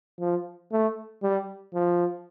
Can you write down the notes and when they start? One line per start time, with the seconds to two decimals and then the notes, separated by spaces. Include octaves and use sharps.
0.20 F3
0.72 A3
1.23 G3
1.74 F3